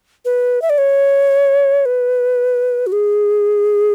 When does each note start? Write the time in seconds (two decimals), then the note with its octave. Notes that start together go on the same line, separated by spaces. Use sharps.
0.25 B4
0.62 E5
0.70 D5
0.78 C#5
1.85 B4
2.86 F#4
2.92 G#4